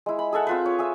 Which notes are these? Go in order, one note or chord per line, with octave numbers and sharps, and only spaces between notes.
G#3 E4
B5
G#4 A4 E5 F#5
C4 F4 B4
C#5
G#4 E5